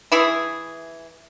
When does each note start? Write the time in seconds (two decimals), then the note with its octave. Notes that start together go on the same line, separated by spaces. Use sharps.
0.12 E3 E4 G#4